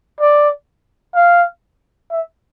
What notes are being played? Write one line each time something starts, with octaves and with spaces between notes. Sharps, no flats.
D5
F5
E5